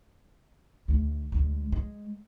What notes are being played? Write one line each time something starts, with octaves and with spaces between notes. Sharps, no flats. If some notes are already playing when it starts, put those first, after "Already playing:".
D2 A3
D2 G#3
G#3